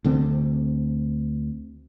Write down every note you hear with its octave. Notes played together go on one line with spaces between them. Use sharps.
D2 D3 C4